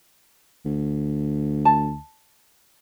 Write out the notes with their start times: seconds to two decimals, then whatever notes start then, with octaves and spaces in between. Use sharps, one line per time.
0.65 D2
1.65 A5